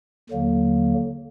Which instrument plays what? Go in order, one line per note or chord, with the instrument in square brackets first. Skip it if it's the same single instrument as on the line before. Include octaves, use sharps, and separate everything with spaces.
[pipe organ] D#2 D3 F#3 A#3